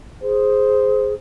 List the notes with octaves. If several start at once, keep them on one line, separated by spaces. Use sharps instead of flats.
G#4 C5